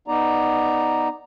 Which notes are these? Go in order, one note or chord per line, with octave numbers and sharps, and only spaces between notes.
B3 D#4 D5 A#5